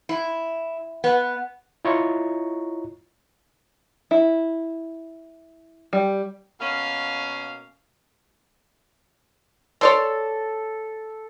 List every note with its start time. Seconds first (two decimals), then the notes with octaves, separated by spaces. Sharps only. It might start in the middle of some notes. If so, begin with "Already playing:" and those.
0.09 E4
1.04 B3
1.85 E4 F4 C#5 D#5 A#5 C#6
4.11 E4
5.93 G3
6.59 B2 A#3 C#4 F5
9.81 A4 C#5 D5 C6